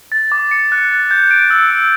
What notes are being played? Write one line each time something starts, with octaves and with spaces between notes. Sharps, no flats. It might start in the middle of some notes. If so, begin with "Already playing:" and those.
A6
D6
C#7
F#6
A6
G6
D7
E6
E6